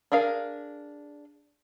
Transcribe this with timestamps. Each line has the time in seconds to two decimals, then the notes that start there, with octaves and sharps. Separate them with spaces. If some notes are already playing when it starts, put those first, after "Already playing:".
0.12 D4 G#4 A#4 F5